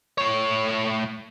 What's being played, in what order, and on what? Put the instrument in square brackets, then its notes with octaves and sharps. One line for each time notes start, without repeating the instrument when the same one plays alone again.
[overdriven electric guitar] A2 C#5